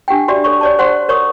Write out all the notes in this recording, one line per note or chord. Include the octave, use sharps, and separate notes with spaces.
D4 G4 F#5 G5
F#4 G4 D5 E5
A4 C#5 C#6
C#5 D5 A5
C5 F#5 C6
A#4 C#5 C#6 D#6